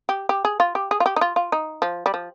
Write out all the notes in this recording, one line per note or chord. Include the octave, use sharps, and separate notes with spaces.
G4
G4
G#4
F4
G4
G#4
F4
G4
D#4
F4
F4
D#4
F3
G3
F3